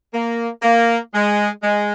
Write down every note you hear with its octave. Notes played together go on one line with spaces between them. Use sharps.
A#3
A#3
G#3
G#3